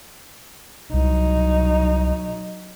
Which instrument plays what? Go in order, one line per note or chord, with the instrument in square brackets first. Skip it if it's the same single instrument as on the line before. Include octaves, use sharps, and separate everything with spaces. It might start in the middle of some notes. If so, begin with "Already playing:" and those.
[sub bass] C2 [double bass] F#3 D#4